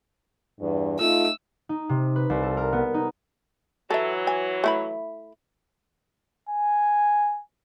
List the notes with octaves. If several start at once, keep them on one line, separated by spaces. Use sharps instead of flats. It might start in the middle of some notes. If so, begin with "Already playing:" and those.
E2 G2
A3 D#4 F4 E6
D#4
C3
B4
C2
A4
A#4
B3
D#4
E3 F#3 A4 E5
G#5
A3 E4 B5
G#5